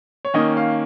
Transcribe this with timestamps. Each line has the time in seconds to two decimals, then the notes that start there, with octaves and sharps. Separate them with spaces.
0.25 C#5
0.34 D#3 A#3 C#4 D#5
0.57 F5